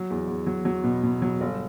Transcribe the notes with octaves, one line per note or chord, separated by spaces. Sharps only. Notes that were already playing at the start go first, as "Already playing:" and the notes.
Already playing: F#3
E2
E2
F#3
F#3
B2
B2
F#3
G1